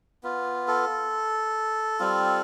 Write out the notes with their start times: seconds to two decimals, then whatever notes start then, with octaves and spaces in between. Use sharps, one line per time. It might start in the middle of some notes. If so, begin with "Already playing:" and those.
0.23 B3 F4
0.68 A4
2.00 G3 C4 F4